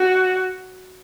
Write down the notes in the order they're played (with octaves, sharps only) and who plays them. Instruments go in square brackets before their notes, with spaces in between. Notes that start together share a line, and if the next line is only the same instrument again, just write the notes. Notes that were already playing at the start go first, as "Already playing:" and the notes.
Already playing: [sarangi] F#4